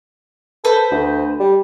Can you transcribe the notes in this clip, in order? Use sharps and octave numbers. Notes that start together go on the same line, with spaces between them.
A4 B4 C5
D2
G3